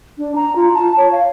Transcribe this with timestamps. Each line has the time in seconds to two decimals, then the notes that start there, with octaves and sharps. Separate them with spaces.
0.18 D4
0.36 A#5
0.56 F4
0.74 A5
0.97 C#5
1.12 F5